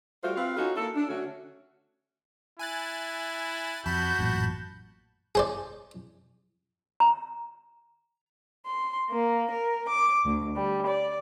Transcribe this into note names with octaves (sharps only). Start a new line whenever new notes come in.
G3 A3 F4 F#4 C5
C4 F4 B4 F5
C#4 D#4 F4 F#4 A4
A#3 E4 A4
D4
D3 A3 C#4 F#4
E4 G#5 F#6 A6
F2 F#4 A5 B5 G6
A1 F#2 A#2
G#4 C5 D5
A#5
C6
A#3
A#4
D6
D2
G3
D5